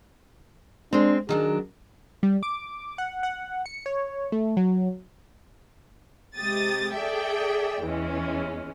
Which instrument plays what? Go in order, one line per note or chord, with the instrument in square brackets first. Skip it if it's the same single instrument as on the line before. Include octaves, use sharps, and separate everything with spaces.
[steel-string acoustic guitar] G#3 C4 [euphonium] D4
[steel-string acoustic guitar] D#3 F#3 D4 [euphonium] G#4
[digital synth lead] G3
D6
F#5
F#5
C#7
C#5
A3
F#3
[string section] C3 G#3 G4 D#6 A6
G#4 A4 D5 E5 G5
E2 E3 G#3 C#4